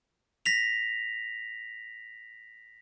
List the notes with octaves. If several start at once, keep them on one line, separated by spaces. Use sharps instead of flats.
A#6 B6 F7